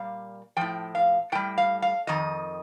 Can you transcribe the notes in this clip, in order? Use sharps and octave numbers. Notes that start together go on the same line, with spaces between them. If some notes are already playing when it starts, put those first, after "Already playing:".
Already playing: A#2 G3 F5
A2 F3 G5
F5
A2 G3 G5
F5
F5
F2 D#3 D#5